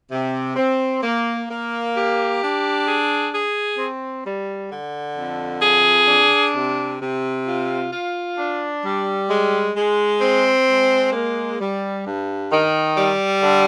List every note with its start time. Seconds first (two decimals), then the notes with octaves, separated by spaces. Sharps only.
0.12 C3
0.56 C4
1.03 A#3
1.49 A#3
1.94 G4
2.41 D4
2.87 G#4
3.33 G#4
3.78 C4
4.24 G3
4.71 D3
5.16 F2
5.62 G#4
6.08 D4
6.54 C3
7.01 C3
7.46 F4
7.91 F4
8.37 D4
8.84 G3
9.29 G#3
9.76 G#3
10.21 C4
10.68 G#3
11.13 A#3
11.59 G3
12.05 G2
12.52 D#3
12.97 G3
13.43 D3